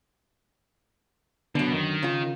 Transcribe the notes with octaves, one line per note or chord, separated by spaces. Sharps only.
F#2 B2 D3
D#3
C#3 F4